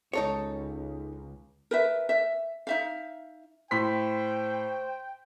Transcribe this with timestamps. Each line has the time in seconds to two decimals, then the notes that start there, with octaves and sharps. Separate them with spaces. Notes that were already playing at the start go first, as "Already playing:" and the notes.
0.13 C#2 D#4 A4 C#5
1.71 A#4 B4 E5
2.09 E5
2.67 D#4 E5 F5
3.71 A2 C5 G5 C6 B6